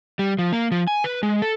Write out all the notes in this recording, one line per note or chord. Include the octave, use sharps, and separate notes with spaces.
G3
F3
A#3
F3
G#5
B4
G#3
A4